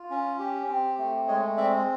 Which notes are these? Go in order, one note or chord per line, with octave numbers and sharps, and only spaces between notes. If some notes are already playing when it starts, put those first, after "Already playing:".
Already playing: F4
C#4
G4
C4
A3
G#3 C#5 D#5
C4 D5 E5